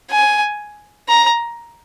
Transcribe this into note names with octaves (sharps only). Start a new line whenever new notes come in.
G#5
A#5